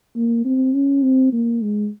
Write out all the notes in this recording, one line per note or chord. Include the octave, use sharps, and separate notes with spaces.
A#3
C4
C#4
C4
A#3
G#3